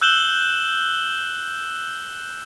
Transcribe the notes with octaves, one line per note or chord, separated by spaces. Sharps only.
E6 F#6 G6 E7 F#7 G7